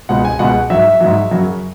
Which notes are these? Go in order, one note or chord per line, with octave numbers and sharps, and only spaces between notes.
C#2 B2 G#3 F#5
G#5
C#2 B2 G#3 F#5
G#2 F#3 E5
G#2 F#3
F#2 C#3 F#3